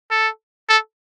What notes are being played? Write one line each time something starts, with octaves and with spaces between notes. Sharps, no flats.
A4
A4